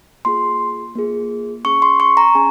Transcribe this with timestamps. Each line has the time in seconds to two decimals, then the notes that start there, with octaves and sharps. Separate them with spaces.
0.25 A#3 F4 G#4 C6
0.95 A#3 F4 G#4
1.65 C#4 G#4 C#6
1.82 C6
2.00 C#6
2.17 A#5
2.35 C#4 G#4 G#5